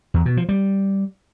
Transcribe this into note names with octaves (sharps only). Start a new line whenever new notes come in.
E2
B2
F3
G3